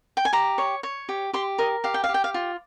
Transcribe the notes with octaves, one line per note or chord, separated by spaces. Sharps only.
G5
G#5
G4 A#5
C#5
C#5
G4
G4 C6
A#4 D#5
G4 F5
G5
F5
G4
G5
F5
F4